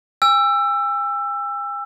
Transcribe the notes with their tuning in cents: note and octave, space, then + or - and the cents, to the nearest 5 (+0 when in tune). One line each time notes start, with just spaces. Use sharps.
G#5 -45 E6 +20